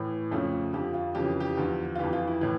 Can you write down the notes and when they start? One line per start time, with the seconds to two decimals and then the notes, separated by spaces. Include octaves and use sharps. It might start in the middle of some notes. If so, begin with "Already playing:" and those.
Already playing: A2 E3
0.31 F2 C#3 F3 A3
0.73 F2 D3 F3 G4
0.94 F4
1.15 F2 C#3 E3 G4
1.40 G4
1.57 E2 D3 F3
1.95 F4
1.99 F2 E3 G4
2.13 F4
2.27 E4
2.41 A2 E3